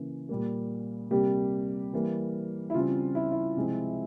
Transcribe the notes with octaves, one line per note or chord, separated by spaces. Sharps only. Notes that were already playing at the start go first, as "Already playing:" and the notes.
Already playing: C#3 E3 A#3
A#2 G3 A#3
C3 G3 A#3 G4
E3 G3 A#3
E4
C#3 G3 C4 F4
E4
E4
C3 F3 G#3 C4